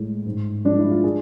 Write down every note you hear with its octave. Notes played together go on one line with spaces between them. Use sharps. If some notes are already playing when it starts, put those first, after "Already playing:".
Already playing: A2 G#3
G#2
F3 G#3 D4
E4
F4
G#4